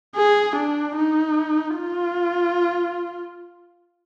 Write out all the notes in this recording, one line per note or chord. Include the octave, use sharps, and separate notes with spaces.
G#4
D4
D#4
F4